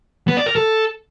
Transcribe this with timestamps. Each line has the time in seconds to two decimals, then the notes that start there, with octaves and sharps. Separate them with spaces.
0.28 B3
0.37 D5
0.46 A#4
0.56 A4